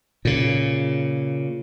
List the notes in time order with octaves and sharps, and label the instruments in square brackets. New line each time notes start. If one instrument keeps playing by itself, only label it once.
[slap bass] A#2 C#3